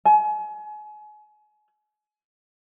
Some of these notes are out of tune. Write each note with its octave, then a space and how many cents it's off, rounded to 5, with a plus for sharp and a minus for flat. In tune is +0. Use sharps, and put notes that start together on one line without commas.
G#5 +35